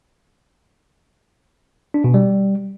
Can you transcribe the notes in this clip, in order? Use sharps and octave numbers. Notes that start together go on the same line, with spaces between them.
D4
B2
G3